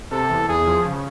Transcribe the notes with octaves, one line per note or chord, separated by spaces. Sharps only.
C3 A4
E2
E2 G#4
F3
C#3